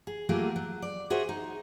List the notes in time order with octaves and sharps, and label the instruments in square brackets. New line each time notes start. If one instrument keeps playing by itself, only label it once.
[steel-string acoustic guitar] G#4
F#3 A3 A#3 F4 G4 G#4
F#3
D5
F#4 G#4 C5 E5
D#4